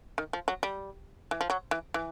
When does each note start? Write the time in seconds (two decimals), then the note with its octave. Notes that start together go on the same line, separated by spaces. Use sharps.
0.18 D#3
0.33 F3
0.48 F#3
0.63 G3
1.31 E3
1.41 F3
1.50 F#3
1.71 E3
1.94 E3